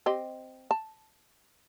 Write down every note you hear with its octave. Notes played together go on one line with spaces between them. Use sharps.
C4 G4 D#5
A5